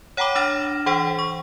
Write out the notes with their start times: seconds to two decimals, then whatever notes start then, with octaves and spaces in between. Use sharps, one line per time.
0.17 C#5 F#5 G5 A#5 B5 D6
0.36 D4 F6 A6 A#6 E7
0.86 E3 C5 F#5 G5 C#6
1.19 C#6